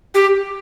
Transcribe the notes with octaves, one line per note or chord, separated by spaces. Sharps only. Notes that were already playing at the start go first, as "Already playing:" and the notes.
G4